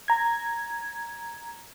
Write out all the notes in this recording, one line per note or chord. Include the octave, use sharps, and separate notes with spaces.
A#5 G#6